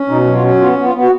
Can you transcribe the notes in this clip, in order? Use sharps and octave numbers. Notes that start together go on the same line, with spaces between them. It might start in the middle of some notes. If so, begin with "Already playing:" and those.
Already playing: C#4
B2 D#4
F#3
F4
C#4
B3 F4
B3
F4
B3
F#4